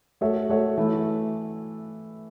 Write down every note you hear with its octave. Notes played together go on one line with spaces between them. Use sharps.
A3 F#4 A4 C#5 E5
A3 F#4 A4 C#5 E5
E3 A3 E4